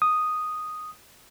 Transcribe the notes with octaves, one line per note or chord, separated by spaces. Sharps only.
D#6